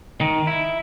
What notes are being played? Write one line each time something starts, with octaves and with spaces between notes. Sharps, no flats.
D#3
E4